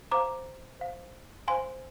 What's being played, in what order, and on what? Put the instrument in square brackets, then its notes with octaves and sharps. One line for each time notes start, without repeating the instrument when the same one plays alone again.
[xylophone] C5 F5 A#5 D6
C5 F5
C5 F5 G#5 C6